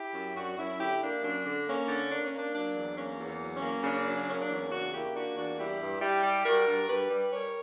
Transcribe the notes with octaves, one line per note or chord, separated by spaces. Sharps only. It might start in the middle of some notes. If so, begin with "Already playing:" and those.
Already playing: E4 G4
F#2
F#2 D4 F#4
F#2 C#4 E4
D3 E4 G4
A#3 D4
F#2 D4
D3
A#3 C#4
D3
A#3 D4
C#4
A#3
D4
F#3 D4
E2
A#3 C#4
E2
F#3
C#4
A#3
C#3 D4
F#3
A#3 C#4
D4
E2 C#4
C#3 D4 F#4
A#3 E4 G4
A#3 D4 F#4
E2 D4 F#4
G3 E4 G4
G2
G3 E4 G4
G3
G3 F#4 A#4
G2
G2 G4 B4
G3
G3 A#4 C#5